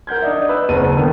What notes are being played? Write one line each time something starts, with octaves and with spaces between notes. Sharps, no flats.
A#4 F#5 G6 G#6
D4 D#4 D5 E5
B4 E6
F#1 C4 F#5 A5 D#7
A5
D3 D#3 B3